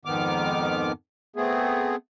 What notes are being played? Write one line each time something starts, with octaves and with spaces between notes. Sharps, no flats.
F2 G#2 D#3 B3 D6 F6
A3 B3 C4 G#4